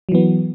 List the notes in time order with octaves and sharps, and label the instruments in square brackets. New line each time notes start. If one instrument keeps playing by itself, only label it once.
[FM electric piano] F#3
E3
B3